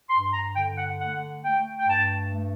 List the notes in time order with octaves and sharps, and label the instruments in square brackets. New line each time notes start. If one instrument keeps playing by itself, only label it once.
[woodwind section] G2 C6
A#5
D3 G5
F#5
A3 F#5
A3 G5
G5
G2 A5
A3